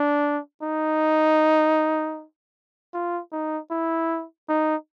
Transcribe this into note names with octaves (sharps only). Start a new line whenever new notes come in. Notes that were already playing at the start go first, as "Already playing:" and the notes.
Already playing: D4
D#4
F4
D#4
E4
D#4